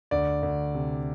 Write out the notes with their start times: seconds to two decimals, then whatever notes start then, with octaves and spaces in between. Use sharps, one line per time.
0.11 D2 D5
0.43 D2
0.74 C3